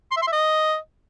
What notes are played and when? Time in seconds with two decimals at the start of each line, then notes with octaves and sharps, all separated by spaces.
0.11 C6
0.17 E5
0.22 C6
0.27 E5
0.33 D#5